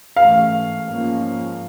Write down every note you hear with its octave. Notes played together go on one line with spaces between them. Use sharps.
G#2 E3 A3 C#4 F5
G#2 F3 A#3 C#4